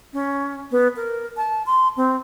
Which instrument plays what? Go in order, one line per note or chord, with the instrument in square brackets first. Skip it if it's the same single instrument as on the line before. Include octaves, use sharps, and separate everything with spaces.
[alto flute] C#4
B3
A#4
A5
C6
C4